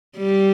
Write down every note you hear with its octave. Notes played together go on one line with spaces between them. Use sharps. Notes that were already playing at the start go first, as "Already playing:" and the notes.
G3